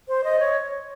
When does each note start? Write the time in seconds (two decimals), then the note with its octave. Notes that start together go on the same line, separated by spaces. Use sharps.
0.08 C5
0.24 D#5
0.40 C#5